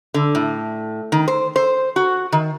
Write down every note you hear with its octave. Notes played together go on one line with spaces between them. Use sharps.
D3
A2
D#3
C5
C5
F#4
D#3